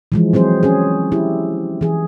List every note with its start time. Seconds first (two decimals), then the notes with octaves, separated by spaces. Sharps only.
0.12 E3 F3 G#3
0.33 F#3 C4 G#4 C5
0.63 C#4 G#4
1.12 E4 G4
1.81 E3 G#4